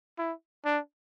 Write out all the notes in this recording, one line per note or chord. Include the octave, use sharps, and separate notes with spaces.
E4
D4